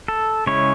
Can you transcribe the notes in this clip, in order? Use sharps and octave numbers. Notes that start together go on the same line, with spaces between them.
A4
C#3 G#3 C#4 E4 C#5